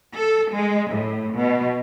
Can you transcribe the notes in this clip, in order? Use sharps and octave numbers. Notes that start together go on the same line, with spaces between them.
A4
G#3
A2
B2